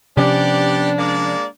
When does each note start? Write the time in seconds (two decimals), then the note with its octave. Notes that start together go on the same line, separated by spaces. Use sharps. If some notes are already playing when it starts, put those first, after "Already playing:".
0.17 C3 F3 B3 C#4 D4 G4 D5
0.98 G#3 A#3 D5